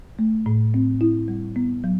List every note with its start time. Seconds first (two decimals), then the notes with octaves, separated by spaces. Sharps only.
0.19 A3
0.46 A2
0.74 C4
1.01 E4
1.28 G3
1.56 B3
1.84 F#3